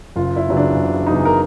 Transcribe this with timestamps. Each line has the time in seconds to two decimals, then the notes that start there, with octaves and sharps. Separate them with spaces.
0.16 F#1 F4
0.36 E4
0.47 E2 C#3 F#3
0.57 D4
0.76 F#1
1.07 E2 C#3 F#3 D#4
1.25 A#4